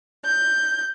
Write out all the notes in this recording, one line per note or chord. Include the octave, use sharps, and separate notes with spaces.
G6